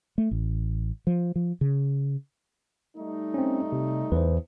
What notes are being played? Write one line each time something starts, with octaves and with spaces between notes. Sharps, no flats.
A3
A1
F3
F3
C#3
G3 A3 D#4
C4 C#4
C3
E2 B4 C5